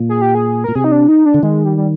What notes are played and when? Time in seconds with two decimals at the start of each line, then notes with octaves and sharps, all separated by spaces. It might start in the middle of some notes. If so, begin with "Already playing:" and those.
Already playing: A#2
0.09 G#4
0.21 G4
0.35 G#4
0.64 A#2 A#4
0.75 C3 G#4
0.84 D#4
0.92 D4
1.08 D#4
1.26 D4
1.34 D3
1.43 D#3 G#3
1.65 G3
1.77 G3